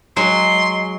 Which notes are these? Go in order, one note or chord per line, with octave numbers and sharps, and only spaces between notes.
F#3 G#3 C6